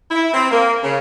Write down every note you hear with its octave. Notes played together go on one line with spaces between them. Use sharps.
E4
C4
A#3
C#3